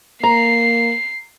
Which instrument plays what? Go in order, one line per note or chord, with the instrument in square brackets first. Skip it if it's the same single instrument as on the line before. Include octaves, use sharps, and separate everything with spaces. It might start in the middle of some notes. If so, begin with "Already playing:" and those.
[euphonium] A#3 [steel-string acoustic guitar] A#5 [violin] C7